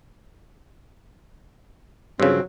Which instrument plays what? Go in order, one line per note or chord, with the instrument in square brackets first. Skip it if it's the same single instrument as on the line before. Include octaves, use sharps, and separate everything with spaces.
[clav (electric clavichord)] G2 C#3 [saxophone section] F3 F#3 C4